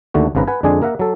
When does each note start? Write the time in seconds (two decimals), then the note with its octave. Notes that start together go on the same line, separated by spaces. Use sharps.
0.14 D#2 D3 A3 F#4
0.35 G#1 G#2 C#3 B4 A#5
0.47 B4 F#5 G#5
0.63 F2 D3 G#3 D4 G#4 G#5
0.81 A#3 A#4 E5 F#5 A#5
0.99 F#3 A4